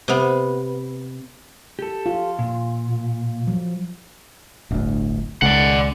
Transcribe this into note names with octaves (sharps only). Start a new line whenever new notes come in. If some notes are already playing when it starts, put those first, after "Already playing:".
C3 B3
G4 A4
F4
A#2
F3 F#3
D1 G1 D2
C#2 C#3 D5 F#5